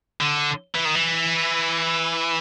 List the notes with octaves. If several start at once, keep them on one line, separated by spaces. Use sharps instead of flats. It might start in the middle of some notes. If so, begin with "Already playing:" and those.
D3
E3
D#3
E3